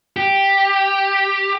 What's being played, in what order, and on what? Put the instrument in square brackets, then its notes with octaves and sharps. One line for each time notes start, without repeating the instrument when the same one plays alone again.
[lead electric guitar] G4